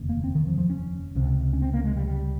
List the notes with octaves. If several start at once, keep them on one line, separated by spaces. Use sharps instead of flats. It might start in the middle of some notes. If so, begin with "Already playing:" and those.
Already playing: F1 D#2 C#3
A#3
C4
D#3
F3
F3
C#4
C#2 C3
C#4
C4
A#3
G#3
G3
G3